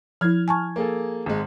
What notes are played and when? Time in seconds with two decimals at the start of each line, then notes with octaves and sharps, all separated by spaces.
0.21 F3 E4 F6 G#6
0.48 G#5 A5 C#6
0.76 A#3 G#4 A4
1.26 G#1 G#3